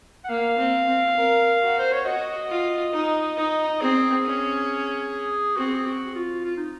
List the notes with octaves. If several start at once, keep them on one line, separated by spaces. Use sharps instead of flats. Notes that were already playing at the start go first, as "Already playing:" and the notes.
F#5
A#3 F5
C4
C4
A#4
F#4
C5
C#5
F#4 D#5
F4
D#4
D#4
C4 G#4
C#4
C4 F#4
G#4
F#4
F4
F4
D#4